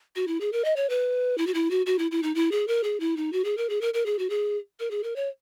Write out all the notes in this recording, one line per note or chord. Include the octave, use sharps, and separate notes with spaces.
F#4
E4
G#4
A#4
D#5
C#5
B4
E4
F#4
E4
F#4
F#4
E4
E4
D#4
E4
G#4
A#4
G#4
E4
D#4
F#4
G#4
A#4
G#4
A#4
A#4
G#4
F#4
G#4
A#4
G#4
A#4
C#5